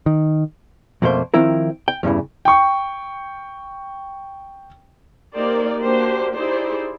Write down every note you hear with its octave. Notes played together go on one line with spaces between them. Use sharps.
D#3
F2 B2 A3 A#3 C5
D#3 F3 C4 E4 A#4
G5
E2 G2 C#3 E3
G5 C#6
A#3 D#4 G4 A#4 C5 D5
A#3 D4 F#4 G4 C5
D#4 E4 G4 G#4 C5 D5